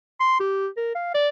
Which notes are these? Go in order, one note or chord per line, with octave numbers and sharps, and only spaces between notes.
C6
G4
A#4
F5
D5